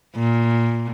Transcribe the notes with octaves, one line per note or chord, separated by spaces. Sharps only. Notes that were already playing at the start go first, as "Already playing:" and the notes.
A#2